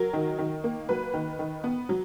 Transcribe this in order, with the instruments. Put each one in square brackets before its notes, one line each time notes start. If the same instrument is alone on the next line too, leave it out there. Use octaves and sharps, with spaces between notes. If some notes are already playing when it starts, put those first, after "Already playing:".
Already playing: [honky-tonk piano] F#3 A#4
D#3
D#3
A#3
F#3 B4
D#3
D#3
B3
F#3